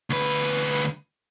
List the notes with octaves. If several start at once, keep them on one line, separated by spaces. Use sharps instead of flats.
D2 B4